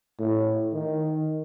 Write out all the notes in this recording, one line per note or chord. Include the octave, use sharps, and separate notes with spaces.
A2
D#3